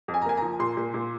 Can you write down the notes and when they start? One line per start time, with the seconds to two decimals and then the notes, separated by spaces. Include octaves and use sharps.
0.08 F2
0.14 G#5
0.22 A#5
0.26 A#3 G#5
0.37 F3 A#5
0.59 A#2 C6
0.77 A#2
0.94 A#2